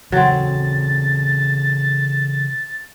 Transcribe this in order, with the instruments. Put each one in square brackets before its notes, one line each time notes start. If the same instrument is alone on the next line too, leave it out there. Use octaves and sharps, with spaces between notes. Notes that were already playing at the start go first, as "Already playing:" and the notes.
[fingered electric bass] C#3 E3 [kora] F#3 C4 [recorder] A6